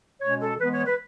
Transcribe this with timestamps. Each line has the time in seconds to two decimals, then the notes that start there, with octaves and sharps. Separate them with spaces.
0.21 B2 G#3 C#4 C#5
0.42 A4
0.59 E3 G#3 B3 B4
0.73 C#5
0.86 B4